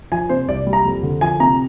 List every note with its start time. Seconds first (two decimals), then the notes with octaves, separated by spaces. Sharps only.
0.12 F3 G#5
0.29 C3 C5
0.48 C2 D5
0.67 G3
0.73 A#5
0.85 F2
1.03 D3
1.21 F3 G#5
1.40 C3 A#5